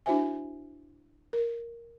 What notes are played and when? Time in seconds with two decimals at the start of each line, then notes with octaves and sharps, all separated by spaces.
0.06 D4 E4 F#4 C5 E5 G#5
1.33 A#4